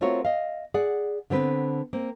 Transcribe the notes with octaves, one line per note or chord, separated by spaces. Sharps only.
A3 C4 F4 F#4 A#4 C#5
D#5 F5
G#4 D5 F#5
D3 B3 C4 B4
A#3 C4